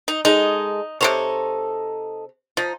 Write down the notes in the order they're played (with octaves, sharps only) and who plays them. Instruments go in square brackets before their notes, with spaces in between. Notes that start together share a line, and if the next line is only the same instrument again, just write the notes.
[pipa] D#4
[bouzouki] G#3 A4 D#5 [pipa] D#4
[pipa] C3 C5 C#5 [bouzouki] D#4 A4
[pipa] F3 [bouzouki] D#4